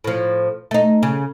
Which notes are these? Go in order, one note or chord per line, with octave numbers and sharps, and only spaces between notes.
A2 F3
A3 D#4
C#3